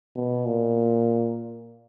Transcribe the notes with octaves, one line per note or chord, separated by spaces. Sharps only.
B2
A#2